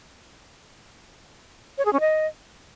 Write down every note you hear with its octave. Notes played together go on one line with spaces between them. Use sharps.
C#5
G#4
C#4
D#5